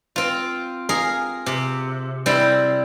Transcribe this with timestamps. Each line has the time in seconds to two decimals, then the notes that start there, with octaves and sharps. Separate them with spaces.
0.16 C4 F4
0.89 G#4 A#4 F5
1.46 C3
2.26 G3 C4 E4